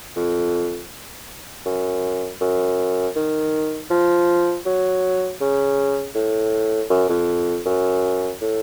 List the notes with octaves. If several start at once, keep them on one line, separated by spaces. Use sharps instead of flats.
F2
F#2
F#2
D#3
F3
F#3
C#3
A2
F#2
F2
F#2
A2